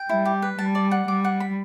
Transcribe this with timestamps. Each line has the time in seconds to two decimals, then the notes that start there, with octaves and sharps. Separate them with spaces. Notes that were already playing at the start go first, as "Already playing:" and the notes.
Already playing: G5
0.09 G3 E4
0.25 G4
0.42 B4
0.58 G3 A5
0.75 D5
0.91 F#5
1.08 G3 D6
1.24 F#5
1.40 B5